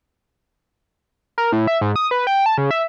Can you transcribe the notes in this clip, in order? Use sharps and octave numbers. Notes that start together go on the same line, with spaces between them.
A#4
A2
E5
G#2
D#6
B4
G5
A5
C#3
E5